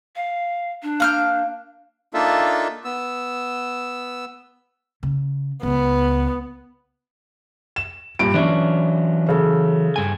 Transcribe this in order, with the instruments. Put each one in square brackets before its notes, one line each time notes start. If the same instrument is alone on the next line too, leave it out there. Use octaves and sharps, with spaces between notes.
[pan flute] F5
D4
[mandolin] A#3 F6 G6
[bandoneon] A#3 D4 D#4 F4 A4 E5
B3 E6
[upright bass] C#3
[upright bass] C#2 [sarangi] B3
[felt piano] E7
G2 A#2 D7
[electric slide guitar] E3 F#3 E5 [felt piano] C#4 D4
[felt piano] C#3 A4
[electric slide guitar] G2 G#5